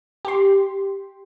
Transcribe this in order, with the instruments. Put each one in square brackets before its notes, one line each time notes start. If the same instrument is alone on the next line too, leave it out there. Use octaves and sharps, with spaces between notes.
[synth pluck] G4 C6